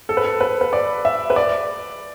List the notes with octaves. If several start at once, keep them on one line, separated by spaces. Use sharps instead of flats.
A4
B4
A4
B4
B4
D5
E5
B4
D5